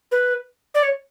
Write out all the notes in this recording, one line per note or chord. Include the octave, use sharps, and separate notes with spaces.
B4
D5
C#5